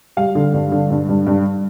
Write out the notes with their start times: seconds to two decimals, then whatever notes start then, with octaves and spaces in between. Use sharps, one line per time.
0.17 G3 F5
0.35 D3
0.53 G2
0.72 D3
0.91 G2
1.09 G2
1.27 G2